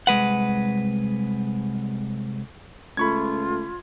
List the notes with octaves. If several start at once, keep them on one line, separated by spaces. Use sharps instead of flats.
C2 G#3 B4 F#5
C#2 A3 F4 B5 C#6 G#6